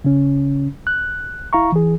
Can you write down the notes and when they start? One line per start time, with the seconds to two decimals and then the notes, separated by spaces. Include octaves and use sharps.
0.04 C#3 C#4
0.87 F#6
1.53 E4 F5 A#5 C#6
1.72 E3 G#4